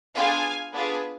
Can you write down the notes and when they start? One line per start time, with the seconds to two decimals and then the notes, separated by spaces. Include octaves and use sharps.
0.15 B3 D4 F4 G#4 F5 G#5
0.73 B3 D4 F4 G#4